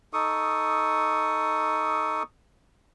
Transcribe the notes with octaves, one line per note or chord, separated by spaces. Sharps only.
D#4 A4 C#6 D#6